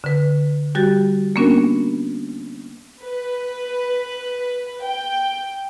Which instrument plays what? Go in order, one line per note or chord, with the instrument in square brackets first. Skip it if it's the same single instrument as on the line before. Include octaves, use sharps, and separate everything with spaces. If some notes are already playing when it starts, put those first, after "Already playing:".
[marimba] D3 B4
G3 F#4 G4 A6
A#3 B3 C#4 D4 F#4 A#4
[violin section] B4
G5